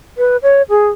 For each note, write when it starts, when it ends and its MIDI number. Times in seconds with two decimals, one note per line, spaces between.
0.17 0.37 71
0.42 0.62 73
0.69 0.88 68